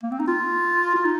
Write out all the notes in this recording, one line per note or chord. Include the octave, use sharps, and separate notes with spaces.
A#3
C4
D#4
F4
F4
D#4